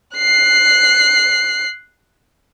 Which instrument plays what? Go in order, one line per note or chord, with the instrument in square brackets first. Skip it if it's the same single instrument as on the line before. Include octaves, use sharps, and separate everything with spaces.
[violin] F#6 C7